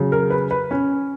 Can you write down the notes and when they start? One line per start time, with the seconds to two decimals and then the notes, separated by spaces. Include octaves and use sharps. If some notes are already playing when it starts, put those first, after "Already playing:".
Already playing: C#3 F#3
0.12 A#4
0.30 B4
0.51 B4
0.71 C#4